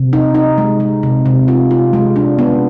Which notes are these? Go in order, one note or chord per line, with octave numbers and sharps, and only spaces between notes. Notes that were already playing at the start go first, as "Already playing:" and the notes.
Already playing: C3
D#4
D#4
G#3
G#3
C3
C3
F4
F4
G#3
D4
B3